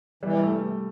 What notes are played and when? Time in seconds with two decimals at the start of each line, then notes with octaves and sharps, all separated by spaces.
0.23 E3 G3
0.33 G3
0.43 A3